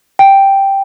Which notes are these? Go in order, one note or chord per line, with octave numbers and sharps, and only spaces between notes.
G5